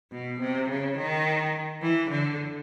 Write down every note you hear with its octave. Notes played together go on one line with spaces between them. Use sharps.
B2
C3
C#3
D#3
E3
D3